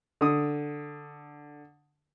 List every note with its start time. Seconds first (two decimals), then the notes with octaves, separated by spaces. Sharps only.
0.21 D3 D#6